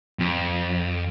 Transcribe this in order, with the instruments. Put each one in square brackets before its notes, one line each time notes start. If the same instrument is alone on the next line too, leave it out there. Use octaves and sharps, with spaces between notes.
[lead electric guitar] F2